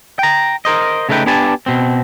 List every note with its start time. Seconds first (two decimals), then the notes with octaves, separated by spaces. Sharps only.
0.19 G5 A#5
0.65 A#4 C5 D#5
1.09 C#3 A3 D#4 B4 G5
1.26 B3 D4 G4 B4 G#5 A5
1.66 B2 C4